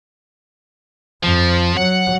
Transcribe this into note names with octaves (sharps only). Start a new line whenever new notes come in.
F2 F3
F#3 F#5